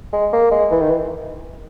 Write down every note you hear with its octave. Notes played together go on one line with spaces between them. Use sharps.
G#3
A#3
G#3
E3
D#3
E3